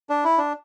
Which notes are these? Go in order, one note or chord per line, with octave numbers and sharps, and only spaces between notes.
D4
E4
D4